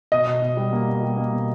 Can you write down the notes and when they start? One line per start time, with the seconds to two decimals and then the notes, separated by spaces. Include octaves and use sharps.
0.12 B2 D#5
0.27 B2
0.42 B2
0.57 G3
0.73 A#3
0.88 B2
1.03 G3
1.17 A#3
1.33 B2